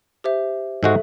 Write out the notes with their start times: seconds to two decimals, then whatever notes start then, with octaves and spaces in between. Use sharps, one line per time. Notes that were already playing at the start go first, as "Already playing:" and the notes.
0.24 G4 C5 E5
0.83 G#2 G#3 F#4 A4 E5